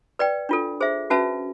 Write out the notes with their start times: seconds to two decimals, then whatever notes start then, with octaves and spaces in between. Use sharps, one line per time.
0.19 B4 D5 G5
0.49 D4 F4 A4
0.80 G#4 C5 E5
1.10 C#4 F#4 B4 E5 A5